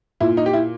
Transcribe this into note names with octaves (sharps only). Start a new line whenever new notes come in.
A#2 E4
D#4
G4
E4